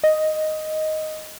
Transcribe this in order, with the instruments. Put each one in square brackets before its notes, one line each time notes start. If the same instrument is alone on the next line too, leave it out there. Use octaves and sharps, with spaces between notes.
[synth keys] D#5